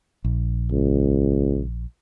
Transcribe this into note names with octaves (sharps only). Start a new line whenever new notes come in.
A#1
C#2